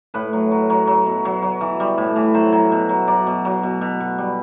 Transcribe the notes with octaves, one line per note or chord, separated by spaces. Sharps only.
A2 B4
F#3
F#3
F#3
F#3
B2
F#3
F#3
E3
G3
A2
E3
F#3 C5
F#3
B2
F#3
F#3 D5
B2
F#3
B2
B2
B2
G3